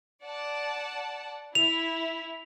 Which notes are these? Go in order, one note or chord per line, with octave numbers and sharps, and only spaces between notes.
D5 F#5 A5
E4 F7